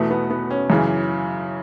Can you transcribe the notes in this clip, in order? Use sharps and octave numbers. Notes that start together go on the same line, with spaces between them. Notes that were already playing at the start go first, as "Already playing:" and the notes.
Already playing: E2 B2 A3
B3
B3
C#4
F#2 C#3 E3